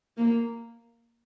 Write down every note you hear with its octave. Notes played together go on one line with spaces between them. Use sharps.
A#3